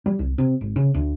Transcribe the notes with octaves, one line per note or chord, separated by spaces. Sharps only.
G3
C2
C3
G#1
C#3
D2